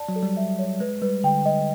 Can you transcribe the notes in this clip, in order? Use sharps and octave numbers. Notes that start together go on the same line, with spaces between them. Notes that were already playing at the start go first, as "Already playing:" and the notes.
Already playing: D5 A5
F#3
A4
G3
E5
C#5
G#3 B4
G3 B4
D3 G5
D#5